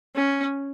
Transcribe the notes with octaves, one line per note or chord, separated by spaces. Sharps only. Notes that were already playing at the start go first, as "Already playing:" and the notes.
C#4